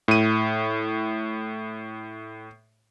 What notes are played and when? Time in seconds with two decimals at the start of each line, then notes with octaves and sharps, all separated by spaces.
0.08 A2 D#7